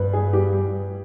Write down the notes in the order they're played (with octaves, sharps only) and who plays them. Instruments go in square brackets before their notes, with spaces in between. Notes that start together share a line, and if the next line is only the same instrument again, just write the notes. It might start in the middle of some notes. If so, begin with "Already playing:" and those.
Already playing: [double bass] G2 [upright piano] B4
[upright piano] G#4
G4